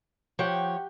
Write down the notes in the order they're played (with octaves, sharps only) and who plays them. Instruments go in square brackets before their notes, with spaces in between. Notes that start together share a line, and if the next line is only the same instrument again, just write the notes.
[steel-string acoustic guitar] F3 C#5 [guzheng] G4 F#5 G5